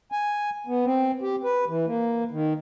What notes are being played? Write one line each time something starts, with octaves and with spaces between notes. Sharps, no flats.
G#5
B3
C4
G4
B4
E3
A#3
D#3